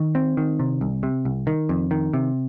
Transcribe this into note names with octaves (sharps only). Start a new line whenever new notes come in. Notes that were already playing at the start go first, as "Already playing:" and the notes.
Already playing: D#3
C4
D#3
C3
C2
C3
C2
D#3
F2
D#3
C3